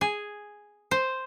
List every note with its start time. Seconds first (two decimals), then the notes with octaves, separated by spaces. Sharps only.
0.01 G#4
0.91 C5